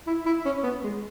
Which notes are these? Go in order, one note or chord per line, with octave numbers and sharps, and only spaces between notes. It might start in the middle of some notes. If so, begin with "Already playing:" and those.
E4
E4
C#4
B3
G#3